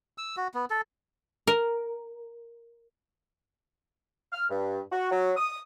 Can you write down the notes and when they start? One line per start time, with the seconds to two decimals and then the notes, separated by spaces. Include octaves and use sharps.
0.18 E6
0.37 F#4
0.54 B3
0.70 A4
1.47 A#4
4.33 F6
4.50 G2
4.92 F#4
5.11 F#3
5.37 D#6